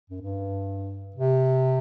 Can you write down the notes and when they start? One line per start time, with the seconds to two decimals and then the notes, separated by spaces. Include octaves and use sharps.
0.10 F#2
0.21 G2
1.16 C3